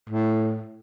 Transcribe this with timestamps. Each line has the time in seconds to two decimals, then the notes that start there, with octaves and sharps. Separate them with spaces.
0.09 A2